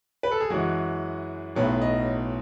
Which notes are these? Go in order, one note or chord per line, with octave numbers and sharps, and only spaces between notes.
B4
A4
G#4
F#2 E3 G#3 F#4
B1 A2 F#3 B3
D#5